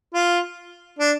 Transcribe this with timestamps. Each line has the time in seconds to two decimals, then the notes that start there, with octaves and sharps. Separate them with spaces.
0.14 F4
0.99 D4